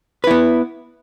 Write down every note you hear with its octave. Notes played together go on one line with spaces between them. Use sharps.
B3 E4 B4